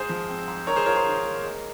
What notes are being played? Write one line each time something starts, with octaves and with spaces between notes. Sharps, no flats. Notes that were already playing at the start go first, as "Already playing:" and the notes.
Already playing: G#2 G#4 C5
F3
C4
G#2
D#3 A#4 C#5
G#4 C5
F4 A#4 C#5
G#4 C5
D#3
A#3
G#3